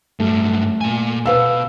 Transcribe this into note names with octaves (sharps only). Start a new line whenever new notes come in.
G2 F#3 A3
A#2 G#5
B2 B4 F5 E6